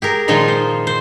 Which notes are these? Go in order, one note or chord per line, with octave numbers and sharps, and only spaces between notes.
G4 G#4 A#4
A#2 D#3 F3 G#3 D#4 F4
C5
C5